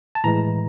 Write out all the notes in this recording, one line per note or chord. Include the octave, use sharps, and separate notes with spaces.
A5
A2 E3 G#3 A#5